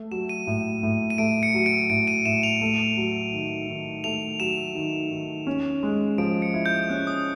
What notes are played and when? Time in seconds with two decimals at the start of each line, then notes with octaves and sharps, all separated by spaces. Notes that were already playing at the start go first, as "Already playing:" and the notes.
Already playing: A3
0.11 F#3 E7
0.29 D#7
0.47 A2
0.83 A2
1.10 D#7
1.18 A3 D7
1.43 C#7
1.54 F#3
1.66 D7
1.90 A2 D7
2.07 D#7
2.25 A2 E7
2.43 F7
2.62 A3
2.97 F#3
3.33 D#3
3.68 D#3
4.04 A3 F7
4.40 F#3 E7
4.75 D#3
5.11 D#3
5.47 C#4
5.83 G#3
6.18 F3 D7
6.42 C#7
6.54 E4
6.66 G6
6.89 C#4 F#6
7.07 D#6